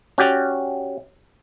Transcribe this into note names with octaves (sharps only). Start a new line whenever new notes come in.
C#4 F#4 G4 D5